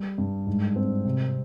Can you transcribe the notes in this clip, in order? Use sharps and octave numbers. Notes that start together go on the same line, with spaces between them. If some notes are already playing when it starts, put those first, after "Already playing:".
Already playing: G3
G2
G#2
C4
C3